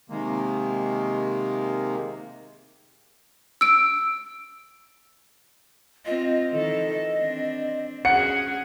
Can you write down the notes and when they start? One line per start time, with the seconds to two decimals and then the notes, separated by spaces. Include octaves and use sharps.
0.10 C3 D#3 G#3 A#3
3.61 E6 D7
6.06 C4 F4 D#5
6.52 D#3 E3 A4
7.17 C4 D4
8.05 C#4 F#4 G#4 F#5 C#7